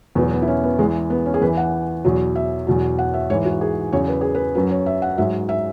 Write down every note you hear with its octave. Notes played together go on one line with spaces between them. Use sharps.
E2 B2 F#3 B3
B3
E4
C#4
B3
E2 E3 G#3
B3
C#4
G#4
E2 E3 B4
F#5
E2 B2 F#3
E5
E2 B2 F#3
F#5
E5
G#2 E3 C#5
F#4
G#4
E2 C#3 F#3 C#5
B4
G#4
B4
F#2 F#3 B4
C#5
E5
F#5
G#2 F#3 E5
E5